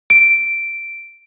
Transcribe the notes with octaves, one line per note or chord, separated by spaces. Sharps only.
D7